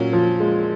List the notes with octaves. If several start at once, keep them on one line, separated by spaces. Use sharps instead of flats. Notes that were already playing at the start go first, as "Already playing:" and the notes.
Already playing: A#2 F#3 C#4
F3
G#3